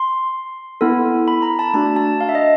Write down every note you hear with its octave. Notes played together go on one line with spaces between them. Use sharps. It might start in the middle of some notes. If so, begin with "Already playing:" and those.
Already playing: C6
B3 E4 A4
B5
A#5
A5
A3 D4 F#4 A5
A5
F5
E5
D#5